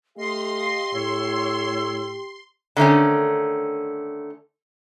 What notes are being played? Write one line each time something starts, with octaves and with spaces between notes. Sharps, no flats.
A3 G4 D#5 F5 C6
A2 C#5 E6
D3 D#3 A3 C#4